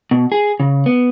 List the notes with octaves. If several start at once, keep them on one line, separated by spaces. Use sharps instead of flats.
B2
G#4
C#3
B3